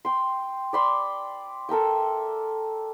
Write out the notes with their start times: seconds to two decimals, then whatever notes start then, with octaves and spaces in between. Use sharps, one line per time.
0.05 G5 C6
0.73 D5 B5 C6
1.69 A4 A#4 E5 G5